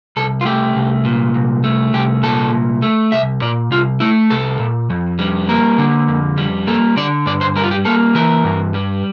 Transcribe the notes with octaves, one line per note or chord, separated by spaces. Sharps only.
C2 A4
F4
A3 G4
C2
A#2
C2
A3
C2 G4
A#2 A4
C2
A3
C2 E5
A#2 D5
C2 F4
A3 E4
C2 A4
A#2
F2
G3
A#3 A#4
D3
F2
G3
A#3 A4
D3 D5
G2 D5
C5
G3 A#4
F4
G4
A#3 A4
E3 A#4
G2
G3